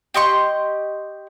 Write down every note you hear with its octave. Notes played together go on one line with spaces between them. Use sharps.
G4 D#5 C6 C#6